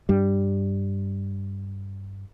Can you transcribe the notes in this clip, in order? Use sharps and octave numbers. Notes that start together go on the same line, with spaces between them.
G2 G3